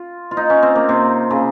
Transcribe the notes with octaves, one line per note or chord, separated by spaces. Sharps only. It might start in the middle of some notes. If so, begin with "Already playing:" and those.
Already playing: F4
F4
D#4
C#4
C4
A#3
C3
C#3